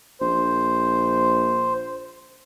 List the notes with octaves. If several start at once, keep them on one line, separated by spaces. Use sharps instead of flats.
A#1 C5